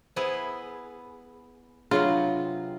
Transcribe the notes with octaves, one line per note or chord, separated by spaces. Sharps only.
B3 E4 G#4 C5
C3 F#3 B3 D4 F4 G#4 C#5